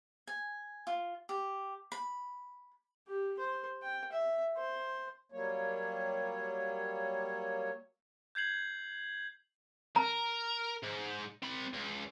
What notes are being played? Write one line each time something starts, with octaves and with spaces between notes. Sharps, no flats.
G#5
F4
G4
B5
G4
C5
G5
E5
C5
F#3 G3 A#3 C#5
G6 G#6 C7 F#7
A#4 A#5
G#2
C4 B5
C#2